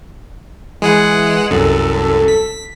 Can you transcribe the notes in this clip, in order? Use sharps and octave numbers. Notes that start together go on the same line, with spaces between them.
E3 G#3 G#4 F#5
C2 F#2 A4
B6